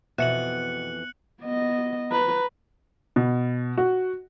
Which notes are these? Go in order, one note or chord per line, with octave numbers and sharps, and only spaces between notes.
F2 B2 E3 E5 F#6 C#7 F#7
B3 D#5
B4 A#5
B2
F#4